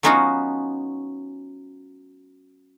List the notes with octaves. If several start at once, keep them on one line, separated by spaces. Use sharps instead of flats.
F#3 B3 C#4 D#4 F4 F#4